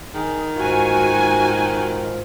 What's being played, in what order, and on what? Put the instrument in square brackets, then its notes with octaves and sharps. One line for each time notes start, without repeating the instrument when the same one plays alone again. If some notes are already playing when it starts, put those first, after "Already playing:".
[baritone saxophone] D#3 [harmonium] G#4
[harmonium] G#2 F4 [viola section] F#4 G#5